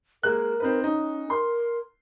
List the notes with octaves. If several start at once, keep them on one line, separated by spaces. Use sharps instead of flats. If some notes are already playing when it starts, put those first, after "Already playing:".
G#3 A#3 A#4 F#6
C4 D#4 B4
C#4 D#4
A#4 C6